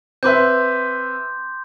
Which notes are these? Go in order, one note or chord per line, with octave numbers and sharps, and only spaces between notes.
C4 B4 E5 C6 D6 G6